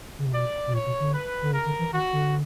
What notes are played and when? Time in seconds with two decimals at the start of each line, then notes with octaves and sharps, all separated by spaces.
0.19 C#3
0.26 C3
0.33 B2 D5
0.67 B2
0.73 A#2 C#5
0.86 B2
1.00 D3
1.13 B4
1.42 D3
1.52 C#3 A#4
1.66 D3
1.79 E3
1.92 D#3 F#4
2.12 D3